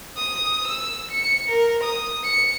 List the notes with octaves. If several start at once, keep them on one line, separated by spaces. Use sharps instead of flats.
D#6
E6
C#7
A#4
D#6
C#7